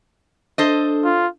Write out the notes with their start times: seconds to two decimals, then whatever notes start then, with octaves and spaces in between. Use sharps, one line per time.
0.58 D4 A4 C5 D#5
1.04 F4